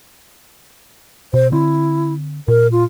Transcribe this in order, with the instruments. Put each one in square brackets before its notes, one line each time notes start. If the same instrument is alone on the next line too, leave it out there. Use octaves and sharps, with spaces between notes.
[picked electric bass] B2 [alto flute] C5
[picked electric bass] D3 C4 [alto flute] E4
[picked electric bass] A#2 [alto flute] A#4
[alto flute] F4